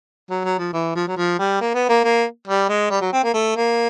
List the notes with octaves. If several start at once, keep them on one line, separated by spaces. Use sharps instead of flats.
F#3
F#3
F3
E3
F3
F#3
F3
G3
A#3
B3
A#3
A#3
G3
G#3
G3
F#3
C4
A#3
A3
A#3